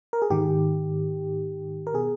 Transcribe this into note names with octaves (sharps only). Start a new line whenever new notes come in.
A#4
G#4
G#2 D#3 G4
A#4
B2 G#4